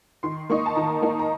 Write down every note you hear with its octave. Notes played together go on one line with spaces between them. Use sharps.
D#3 C6
A#3 D#4 C#6
A5
D#3 A#5
A#3 D#4
A#5